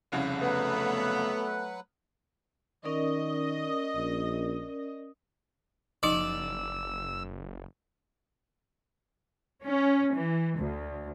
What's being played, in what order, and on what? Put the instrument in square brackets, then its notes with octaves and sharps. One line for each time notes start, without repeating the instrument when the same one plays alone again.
[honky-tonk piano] F1 C2 C#3
[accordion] F#3 B4 F#5 [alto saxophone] A3 [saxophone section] B3
[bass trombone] D#3 [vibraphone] C#4 A#4 D5 [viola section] D#5
[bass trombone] A#1
[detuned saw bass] F#1 [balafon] F3 D#4 [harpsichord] D5 [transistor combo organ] E6
[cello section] C#4
E3
D2